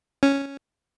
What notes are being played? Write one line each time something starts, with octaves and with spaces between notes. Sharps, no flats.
C#4